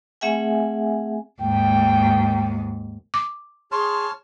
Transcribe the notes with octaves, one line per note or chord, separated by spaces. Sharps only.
A3 C4 G#4 E5 F#5 G#5
D#2 G#2 G5
D6
G#4 C#5 A5 C6 F6